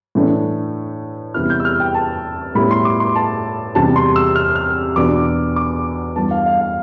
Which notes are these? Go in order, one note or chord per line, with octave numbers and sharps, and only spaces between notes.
A2 E3 A3 D4
E2 C3 G3 B3 E4 F6
G6
E6
F6
G5
A5
A2 G3 B3 E4 B5
C6
D6
C6
A5
E2 C3 G3 A5
C6
E6
F6
F6
E2 B2 B3 D4 D6
D6
G2 E3 B3 A5
F5
F5
F5